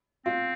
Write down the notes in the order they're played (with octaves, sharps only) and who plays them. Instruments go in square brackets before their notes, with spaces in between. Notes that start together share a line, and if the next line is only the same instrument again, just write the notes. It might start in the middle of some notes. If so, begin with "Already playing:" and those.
[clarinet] C4 [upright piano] F4